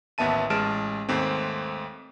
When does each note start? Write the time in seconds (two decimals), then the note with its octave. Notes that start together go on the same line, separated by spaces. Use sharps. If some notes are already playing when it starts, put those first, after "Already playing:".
0.18 A1 D#2 B3 E5 A5 D#7
0.50 A1 G#3 A5 F6 D7 E7
1.09 D#2 G#2 A3 C4